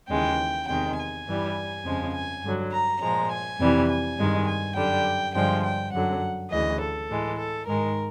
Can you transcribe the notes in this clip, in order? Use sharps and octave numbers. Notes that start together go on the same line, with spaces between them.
D#2 C#3 E3 G#3 G5
E2 C3 D#3 G#3 G5
G#5
G2 E3 G3
F2 C#3 F3 G#3
G#5
G2 D3 F#3
A#5
A#2 F3 G#3 A#5
G#5
F2 C3 E3 G3
G#5
G2 D#3 G#3
G#5
F#2 D3 G3 G5
G2 D3 F3 G#3 G5
G5
F#2 D3 F#3 F#5
D2 C#3 E3 D#5
A4
A2 E3 G#3
A4
G#2 D#3 G#3 A#4